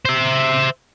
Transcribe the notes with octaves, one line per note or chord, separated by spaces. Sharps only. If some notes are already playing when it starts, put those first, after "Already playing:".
C5 E5